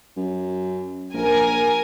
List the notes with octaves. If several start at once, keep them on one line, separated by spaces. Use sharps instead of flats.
F#2
A#1 A#4 G#5